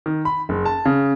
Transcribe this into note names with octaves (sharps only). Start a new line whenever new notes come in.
D#3
B5
F#1
A5
C#3